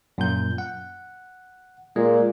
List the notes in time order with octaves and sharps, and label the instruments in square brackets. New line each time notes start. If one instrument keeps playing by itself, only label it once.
[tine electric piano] F#2 A#2 G6
F#5
[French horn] A#2 [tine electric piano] G#3